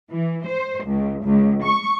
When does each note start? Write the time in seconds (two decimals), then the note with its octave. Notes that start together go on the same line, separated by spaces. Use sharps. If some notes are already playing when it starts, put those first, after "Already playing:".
0.10 E3
0.46 C5
0.85 C#2
1.24 C#2
1.64 C#6